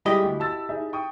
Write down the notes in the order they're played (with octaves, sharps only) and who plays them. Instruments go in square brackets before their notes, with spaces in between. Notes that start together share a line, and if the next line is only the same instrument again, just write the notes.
[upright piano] G3 G#3 [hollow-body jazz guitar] E4 G4 D#5
[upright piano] D2
A5 E6 A6
D#4 G#4 E5
G5 C#6 D#6